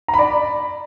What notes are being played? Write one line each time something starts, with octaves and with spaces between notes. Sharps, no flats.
A#5
B5
D5